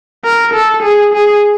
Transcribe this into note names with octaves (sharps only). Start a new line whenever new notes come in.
A#4
A4
G#4
G#4